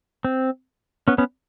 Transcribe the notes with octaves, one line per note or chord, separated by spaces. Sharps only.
C4
B3 C#4
B3 C#4